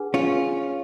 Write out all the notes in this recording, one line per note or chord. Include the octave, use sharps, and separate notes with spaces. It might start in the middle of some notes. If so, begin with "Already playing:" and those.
Already playing: D4 G#4 B4 F#5
C#4 F4